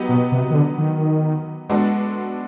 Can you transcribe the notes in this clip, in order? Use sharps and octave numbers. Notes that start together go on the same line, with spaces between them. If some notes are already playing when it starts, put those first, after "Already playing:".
Already playing: F#3 B3 D#4 G4
B2
C3
D#3
D3
D#3
G#3 B3 D4 F#4 A4